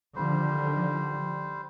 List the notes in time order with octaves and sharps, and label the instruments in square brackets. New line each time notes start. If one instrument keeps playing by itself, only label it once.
[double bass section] D3 D#3 F3 [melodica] G3 C5